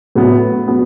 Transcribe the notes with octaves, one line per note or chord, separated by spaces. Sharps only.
A2 F#3 B3
F#3 B3